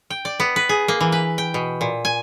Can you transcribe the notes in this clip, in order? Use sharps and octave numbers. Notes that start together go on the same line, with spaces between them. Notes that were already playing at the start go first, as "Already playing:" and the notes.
G5
D5
B3
B4
G#4
A#3
E3
B4
G5
B2
A#2
G#5